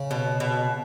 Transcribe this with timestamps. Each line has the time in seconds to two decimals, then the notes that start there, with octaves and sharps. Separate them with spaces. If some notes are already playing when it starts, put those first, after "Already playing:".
Already playing: C#3
0.11 B2
0.40 B2